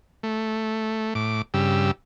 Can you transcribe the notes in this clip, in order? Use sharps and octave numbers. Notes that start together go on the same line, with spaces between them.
A3
A2 D6
G2 C#3 G4 E6